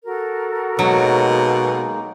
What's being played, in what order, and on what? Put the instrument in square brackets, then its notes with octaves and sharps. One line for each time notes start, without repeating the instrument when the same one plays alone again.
[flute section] F#4 A4 A#4
[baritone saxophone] B2 [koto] F#3 [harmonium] G#3 A#3 D#4